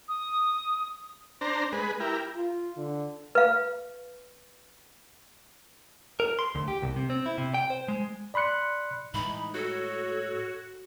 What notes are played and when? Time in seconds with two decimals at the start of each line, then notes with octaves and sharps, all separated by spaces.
0.09 D#6
1.41 D4 C5 A#5
1.72 G#3 B4
2.00 E4 G4 A#4
2.35 F4
2.77 D3
3.35 B4 F5
6.20 A#4
6.39 C6
6.55 D2
6.68 G4
6.82 C2
6.96 C3
7.10 C4
7.26 E4
7.38 C3
7.54 G5
7.70 C5
7.88 G#3
8.34 D5 B5 C6 F#6 C#7
9.14 A2 E3 G3 G#3 D#4 B5
9.54 F#4 A4 C#5